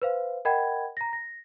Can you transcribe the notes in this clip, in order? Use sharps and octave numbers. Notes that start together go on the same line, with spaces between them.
B4 C5 F5
A#4 D#5 F#5 G5 B5 G#6
A#5 A#6
A#6